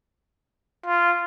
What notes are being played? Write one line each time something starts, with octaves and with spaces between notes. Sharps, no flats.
F4